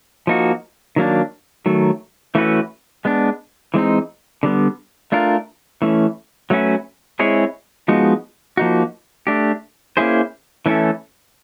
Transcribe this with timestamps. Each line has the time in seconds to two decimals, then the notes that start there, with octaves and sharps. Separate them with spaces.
0.27 F3 A#3 D#4 F#4
0.96 D#3 F#3 A#3 D4
1.66 D#3 F#3 A3
2.35 E3 A3 C#4 F#4 B4
3.05 G#3 B3 D4
3.74 E3 G#3 C4 D#4
4.43 D3 G3 B3
5.12 A3 D4 F4 A#4
5.82 E3 A3 C#4
6.50 F#3 A3 C#4 F#4 B4
7.19 G#3 C4 E4 G#4 C#5
7.88 F3 G#3 B3 D#4 F#4
8.57 F3 A#3 D#4 F#4
9.27 A3 D4 G4
9.97 A#3 C#4 E4 G#4 C5
10.66 E3 A3 C#4 E4 A4